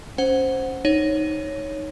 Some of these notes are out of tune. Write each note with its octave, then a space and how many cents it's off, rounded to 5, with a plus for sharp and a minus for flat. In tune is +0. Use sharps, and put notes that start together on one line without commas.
C#4 +0 C5 +0 F#5 +0
D#4 +0 C#5 +0